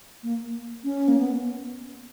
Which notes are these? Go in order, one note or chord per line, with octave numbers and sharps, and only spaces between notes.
A#3
C#4
A#3
B3